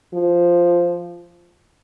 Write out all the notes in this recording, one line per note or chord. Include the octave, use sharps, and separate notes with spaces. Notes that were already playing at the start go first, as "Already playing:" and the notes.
F3